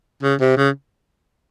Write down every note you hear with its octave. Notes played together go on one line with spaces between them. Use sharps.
C#3
C3
C#3